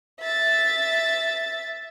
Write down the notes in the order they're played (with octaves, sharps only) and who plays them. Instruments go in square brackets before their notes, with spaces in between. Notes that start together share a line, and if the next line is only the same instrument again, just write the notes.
[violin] E5 A6